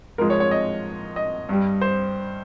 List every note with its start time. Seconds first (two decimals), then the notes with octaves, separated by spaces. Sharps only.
0.18 G#2 F3 G#3 A#4
0.30 C#5
0.40 C#5
0.51 D#5
1.16 D#5
1.49 G2 G3
1.81 C5